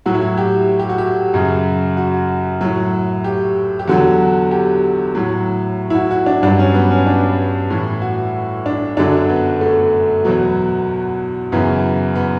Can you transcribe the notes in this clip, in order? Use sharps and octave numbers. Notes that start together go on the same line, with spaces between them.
A2 F#3 F#4
E4
F#4
G4
G4
F#4
G4
F#2 C#3 F#3
F#4
A2 F#3
G4
G4
E2 D3 F#3 F#4
G4
A2 F#3
E4
F#4
F#4
D4
G2 F#3 D4
C#4
B3
C#4
D4
A2 E3
F#4
D4
F#2 D3 F#3 D4
B3
A3
E2 B2 F#3 B3
F#2 C#3 E3 B3
B3